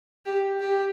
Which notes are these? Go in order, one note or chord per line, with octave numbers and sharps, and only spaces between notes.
G4
G4